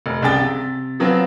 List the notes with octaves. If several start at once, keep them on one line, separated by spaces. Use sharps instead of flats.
F1
C2 C#3 G#4 G5 A6
C3
F3 F#3 B3 C4 F4